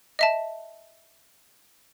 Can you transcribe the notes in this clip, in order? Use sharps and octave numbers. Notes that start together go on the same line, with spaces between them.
D#5 E5 A5